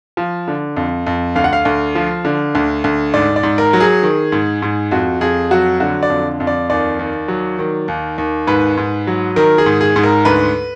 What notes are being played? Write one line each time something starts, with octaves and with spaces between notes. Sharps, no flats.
F3
D3
F2
F2
D2 F5
F#5
F5
D2
F3
D3
D2
D2
G#2 D5
D5
G#2
A#4
F#3
G#4
D#3
G#2
G#2
F2 F#4
F2 G#4
F#3 F#4
D3 F#4
D5
F2
F2
D5
D#2 D5
D#2
F#3
D#3
D#2
D#2
G#2 B4
G#2
F#3
D#3 A#4
G#4
G#2
G#4
G#2
A#4
D2 B4